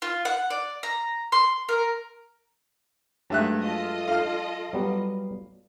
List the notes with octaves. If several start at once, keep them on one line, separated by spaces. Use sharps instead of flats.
F4
F#5
D5
A#5
C6
A#4
G2 F#3 G#3 A3 E5 F#6
F4 A4 D#5
F5 F6
F#3 G3 B3